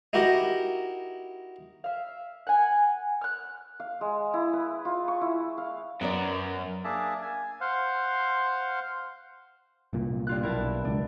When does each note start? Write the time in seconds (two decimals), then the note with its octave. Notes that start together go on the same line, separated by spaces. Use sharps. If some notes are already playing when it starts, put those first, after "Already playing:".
0.13 D#4 E4 F#4 G4 A#4 D#5
1.84 E5 F5
2.47 F#5 G#5
3.21 F6 F#6
3.80 F5
4.01 G#3
4.34 E4
4.53 B4
4.85 F4
5.08 C#6
5.21 E4
5.58 F5
6.01 F#2 B3 A#4 D5
6.84 A#3 D4 G#4 E5 A5
7.22 G#5
7.61 C5 F5 F#5
9.93 C2 A#2
10.27 G2 F4 F#6
10.43 B1 E4 A#4 A5
10.85 C#2 D4